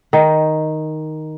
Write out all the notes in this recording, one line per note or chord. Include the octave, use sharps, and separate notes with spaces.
D#3